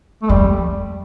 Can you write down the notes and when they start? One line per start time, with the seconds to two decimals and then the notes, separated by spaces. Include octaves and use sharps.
0.22 A3
0.29 F2 G3